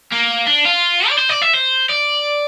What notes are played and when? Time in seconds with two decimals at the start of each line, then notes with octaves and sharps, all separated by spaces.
0.12 A#3
0.47 D4
0.65 F4
1.09 D5
1.18 C5
1.30 D5
1.42 E5
1.53 C5
1.89 D5